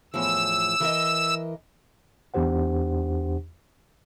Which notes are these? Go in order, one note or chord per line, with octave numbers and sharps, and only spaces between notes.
E2 A2 F3 E6
E3 A#4 D#5
E2 D4 G4 C5 F#5